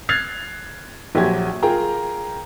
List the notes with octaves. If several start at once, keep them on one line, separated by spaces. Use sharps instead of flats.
F6 F#6 G#6 A6 C7 F7
A#1 F#3 G4 G#6
F4 G#4 A#4 G5 A#5